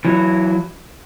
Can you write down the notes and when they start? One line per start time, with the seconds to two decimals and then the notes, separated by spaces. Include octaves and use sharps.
0.05 E3 F#3